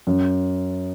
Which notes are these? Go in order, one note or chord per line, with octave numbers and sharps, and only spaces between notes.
F#2